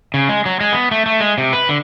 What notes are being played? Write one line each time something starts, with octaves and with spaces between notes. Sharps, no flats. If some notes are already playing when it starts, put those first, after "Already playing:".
C#3
G#3
F#3
G#3
B3
A3
A3
G#3
C3
B4
D3